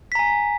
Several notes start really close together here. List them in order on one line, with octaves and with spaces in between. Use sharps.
B6 A#5 G#5